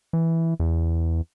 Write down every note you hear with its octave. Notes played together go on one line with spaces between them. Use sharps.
E3
E2